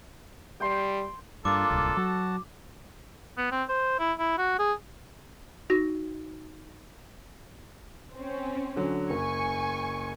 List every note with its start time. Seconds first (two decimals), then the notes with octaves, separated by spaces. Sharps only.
0.60 G3 G5 C6
1.45 G2 A#3 D4 F4 A4 D6
1.70 D1 C2
1.97 F#3 F#4 A5
3.38 B3
3.52 C4
3.69 C5
4.00 E4
4.19 E4
4.38 F#4
4.59 G#4
5.70 D#4 F#4 A#6
8.14 C4 C#4
8.76 D3 F#3
9.10 F#1 G#5 C#6